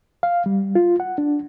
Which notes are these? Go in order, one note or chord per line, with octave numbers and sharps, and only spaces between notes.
F5
G3
F4
F#5
D4